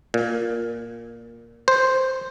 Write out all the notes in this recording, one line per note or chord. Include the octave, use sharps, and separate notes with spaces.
A#2
C5